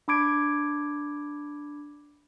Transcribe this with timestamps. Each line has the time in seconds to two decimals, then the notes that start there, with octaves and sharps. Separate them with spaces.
0.08 D4 B5 D6 G#6 D7